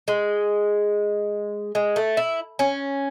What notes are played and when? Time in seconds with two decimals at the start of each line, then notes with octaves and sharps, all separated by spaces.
0.08 G#3
1.75 G#3
1.96 A3
2.17 E4
2.59 C#4